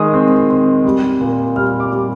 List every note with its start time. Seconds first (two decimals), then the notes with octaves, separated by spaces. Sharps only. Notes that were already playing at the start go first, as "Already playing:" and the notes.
Already playing: D#3 G#3 D#6
0.14 C4
0.50 C4
0.85 G3
1.21 A#2
1.56 G3 F6
1.80 D6
1.91 G3